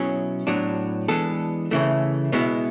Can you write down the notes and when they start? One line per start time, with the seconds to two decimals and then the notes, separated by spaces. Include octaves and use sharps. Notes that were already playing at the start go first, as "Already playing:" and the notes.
Already playing: B2 F#3 C#4 E4 G#4
0.47 A2 F#3 B3 D4
1.08 E3 G#3 B3 D4 A4
1.71 C#3 E3 A3
2.32 B2 G#3 B3 E4